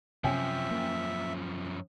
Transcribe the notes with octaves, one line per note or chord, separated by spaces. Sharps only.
F#2 C3 F3 C#4 E5 G5 G#5
A#3